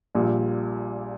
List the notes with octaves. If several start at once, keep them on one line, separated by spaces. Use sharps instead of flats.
A#1 A#2 G3